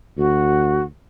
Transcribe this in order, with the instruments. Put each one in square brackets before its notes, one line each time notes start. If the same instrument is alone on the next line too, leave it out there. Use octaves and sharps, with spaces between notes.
[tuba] D2 [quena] F#4